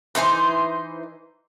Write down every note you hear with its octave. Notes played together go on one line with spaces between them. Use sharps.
E3 D#4 C5 G#5